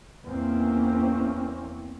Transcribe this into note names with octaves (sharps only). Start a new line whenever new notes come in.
E2 E3 A#3 C4 C#4